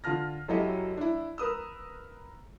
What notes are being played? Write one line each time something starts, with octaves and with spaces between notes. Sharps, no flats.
D3 F4 A5 F6 A#6
F#2 F#3 E4 G4 A4 D#5
D4 E4
A#4 B4 D#6 E6